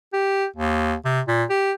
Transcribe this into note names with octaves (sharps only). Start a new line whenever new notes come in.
G4
D#2
C3
A#2
G4